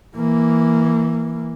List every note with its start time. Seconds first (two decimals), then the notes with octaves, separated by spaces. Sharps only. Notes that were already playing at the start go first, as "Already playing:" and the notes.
0.16 E3 A#3